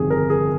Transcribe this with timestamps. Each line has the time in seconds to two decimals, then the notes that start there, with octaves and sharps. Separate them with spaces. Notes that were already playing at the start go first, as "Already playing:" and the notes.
Already playing: G1 F2 C3 D#3 G#4
0.10 A#4
0.30 G#4